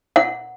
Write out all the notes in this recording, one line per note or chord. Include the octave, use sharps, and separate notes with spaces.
F#5